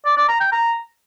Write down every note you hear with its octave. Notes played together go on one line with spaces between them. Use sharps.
D5
D5
A#5
G5
A#5